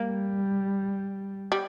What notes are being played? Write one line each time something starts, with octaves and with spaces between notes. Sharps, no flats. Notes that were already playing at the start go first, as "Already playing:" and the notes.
Already playing: G3 A#3
G3